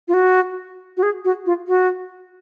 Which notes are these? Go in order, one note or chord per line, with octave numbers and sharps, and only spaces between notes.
F4
F#4
F#4
G#4
F#4
F4
F#4